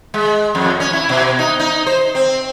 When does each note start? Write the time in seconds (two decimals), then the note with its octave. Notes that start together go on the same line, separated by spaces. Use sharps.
0.14 G#3
0.55 F2
0.80 C#4
0.93 E4
1.09 B2
1.39 D#4
1.59 D#4
1.86 C5
2.15 C4